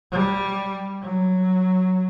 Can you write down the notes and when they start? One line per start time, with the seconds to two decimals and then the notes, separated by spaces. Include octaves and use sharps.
0.12 G3
1.03 F#3